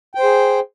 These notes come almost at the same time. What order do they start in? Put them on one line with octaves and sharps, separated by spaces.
G5 C5 G#4